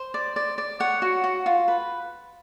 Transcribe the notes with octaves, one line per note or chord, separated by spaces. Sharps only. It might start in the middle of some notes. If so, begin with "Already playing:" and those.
Already playing: C5
D5
D5
D5
C#5 F#5
F#4
F#4
F4
B4